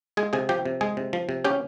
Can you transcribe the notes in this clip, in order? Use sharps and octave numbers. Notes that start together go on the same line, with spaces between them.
G#3 G#4 G#5
C3 G#4 G#5
F3 G4 G5
C3
G#3 G#4 G#5
C3
F3
C3
C#4 G4 G5